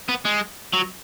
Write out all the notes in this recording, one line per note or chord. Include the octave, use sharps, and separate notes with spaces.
B3
G#3
F#3